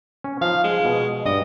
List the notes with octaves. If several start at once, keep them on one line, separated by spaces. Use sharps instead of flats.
C#4
F3 D#4 F5
G#3
B2
G2 D#5